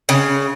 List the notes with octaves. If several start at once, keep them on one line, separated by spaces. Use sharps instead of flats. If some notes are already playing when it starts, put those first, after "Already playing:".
C#3